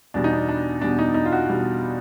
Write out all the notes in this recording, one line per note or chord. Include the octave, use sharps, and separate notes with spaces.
E2 B2 G3 D4
D#4
D4
D4
E2 B2 G3 D4
D#4
D#4
F4
F#4
E2 B2 G3